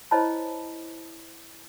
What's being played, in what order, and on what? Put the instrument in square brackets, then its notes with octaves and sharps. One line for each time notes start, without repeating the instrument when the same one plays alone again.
[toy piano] E4 C5 C#5 D#5 A5 B5